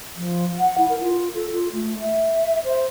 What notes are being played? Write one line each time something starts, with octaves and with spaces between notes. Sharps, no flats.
F3
F#5
E4
A#4
F4
A4
F4
A3
E5
C5